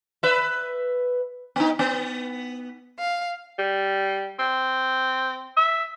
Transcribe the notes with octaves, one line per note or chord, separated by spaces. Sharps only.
B4 E5
B3 D#4
B3
F5
G3
C4
E5